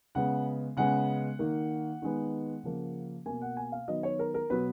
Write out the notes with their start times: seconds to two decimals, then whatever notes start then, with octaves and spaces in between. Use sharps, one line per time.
0.15 C#3 G#3 B3 F#5
0.77 C#3 G#3 B3 F#5
1.39 D#3 A#3
2.02 D#3 G#3 B3
2.63 C#3 F3 A#3
3.26 B2 A#3 G#5
3.42 F#5
3.57 G#5
3.72 F5
3.88 D#3 F#3 B3 D#5
4.03 C#5
4.19 A#4
4.34 A#4
4.50 B2 F#3 B3 B4